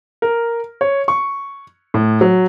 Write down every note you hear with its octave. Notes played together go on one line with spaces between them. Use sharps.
A#4
C#5
C#6
A2
F#3